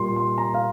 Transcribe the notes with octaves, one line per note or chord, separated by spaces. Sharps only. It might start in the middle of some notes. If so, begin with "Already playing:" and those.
Already playing: A#2 G3 A#3 C6
C6
A#5
F5